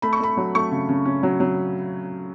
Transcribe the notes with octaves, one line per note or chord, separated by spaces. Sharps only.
A3 B5
C#6
A3 B5
F#3
A3 C#6
C#3
C#3
C#4
F#3
F#3